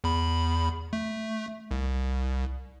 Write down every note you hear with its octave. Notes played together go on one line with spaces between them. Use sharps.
E2 B5
A3
C2